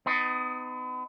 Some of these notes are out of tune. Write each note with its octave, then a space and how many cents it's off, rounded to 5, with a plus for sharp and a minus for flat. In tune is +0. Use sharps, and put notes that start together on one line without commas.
B3 +40 D#4 +0